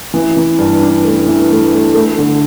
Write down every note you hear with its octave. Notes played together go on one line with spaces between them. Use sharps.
E3
E3
G2
D4
A3
E3
A3
A3
A3
D3